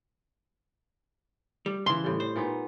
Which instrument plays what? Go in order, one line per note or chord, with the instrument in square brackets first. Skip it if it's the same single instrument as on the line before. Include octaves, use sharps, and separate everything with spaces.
[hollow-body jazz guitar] G3
[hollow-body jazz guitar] C#3 E3 [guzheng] C6
[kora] A2 G3
[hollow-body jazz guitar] C5
[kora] A#2 B3 D#4